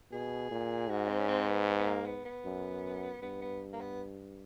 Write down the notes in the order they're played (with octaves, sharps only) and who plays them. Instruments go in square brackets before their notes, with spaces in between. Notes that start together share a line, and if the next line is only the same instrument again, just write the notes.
[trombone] B2 [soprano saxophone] G#4
[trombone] A#2
[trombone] G#2 [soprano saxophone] F#4
[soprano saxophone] C4
C#4
C4
B3
B3
B3
A#3
B3
B3
[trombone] F#2
[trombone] G2 [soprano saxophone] B3
[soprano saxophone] B3
A#3
B3